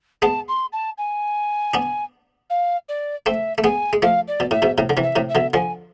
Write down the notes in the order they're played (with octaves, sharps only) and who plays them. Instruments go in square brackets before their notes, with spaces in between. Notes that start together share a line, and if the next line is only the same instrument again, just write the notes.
[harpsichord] G#3 B3 [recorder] A5
[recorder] C6
A5
G#5
[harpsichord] B3 D4
[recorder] F5
D5
[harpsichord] A3 C4 [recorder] E5
[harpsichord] A3
[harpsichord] G#3 B3 [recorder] G#5
[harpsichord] G#3
[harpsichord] F3 A3 [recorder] F5
[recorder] D5
[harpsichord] B2
[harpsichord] A2 [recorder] E5
[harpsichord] G#2 B2
A2 C3
D3
C3 E3
[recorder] E5
[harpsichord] A2 C3
[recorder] E5
[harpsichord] B2 D3
[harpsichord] D3 F3 [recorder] G#5